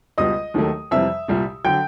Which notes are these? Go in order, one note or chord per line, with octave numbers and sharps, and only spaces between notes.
C#2 B2 G3 D#5 D#6
D#2 D#3 F#3 A3
F2 C3 E3 G3 E5 E6
C2 A#2 G3
D3 F#3 G5 G6